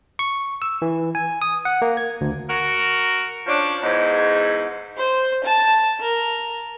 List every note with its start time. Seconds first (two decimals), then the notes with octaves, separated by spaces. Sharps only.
0.19 C#6
0.62 E6
0.82 E3
1.15 G#5
1.41 D#6
1.65 F#5
1.82 A#3
1.97 G#6
2.21 D2
2.48 F#4 A#4
3.46 F3 C#4 D4
3.82 E2 G#2
4.98 C5
5.44 A5
6.00 A#4